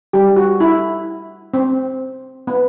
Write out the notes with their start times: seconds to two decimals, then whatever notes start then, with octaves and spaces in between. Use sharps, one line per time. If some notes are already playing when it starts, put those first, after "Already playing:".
0.13 G3 G4
0.36 F#4
0.60 E4
1.54 C4
2.47 B3